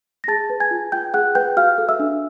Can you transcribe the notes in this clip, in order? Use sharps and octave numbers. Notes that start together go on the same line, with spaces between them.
A#6
G#4 A5 A6
B4
G#5 G#6
F4
F4 G5 G6
G#4 F#5 F#6
B4 G5 G6
F#4 F5 F6
A4
E5 E6
D4